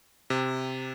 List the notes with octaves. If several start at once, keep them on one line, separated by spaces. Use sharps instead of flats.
C3